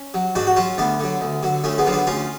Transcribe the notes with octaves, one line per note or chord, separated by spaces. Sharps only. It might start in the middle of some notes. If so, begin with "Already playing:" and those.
Already playing: C#4
F#3
G#2 D4 F#4
F#4
F#3 C#4 F4
D2 B3 D4
D3 F#3
D2
D3 F#3
D2 A3 C#4
G#3 B3
D3 F#3 F4
B3 D4
D2 C#4 F4